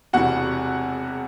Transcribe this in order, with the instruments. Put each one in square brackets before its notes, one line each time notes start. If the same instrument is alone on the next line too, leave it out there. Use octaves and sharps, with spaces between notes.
[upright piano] E1 E2 C3 E3 F#4 F#5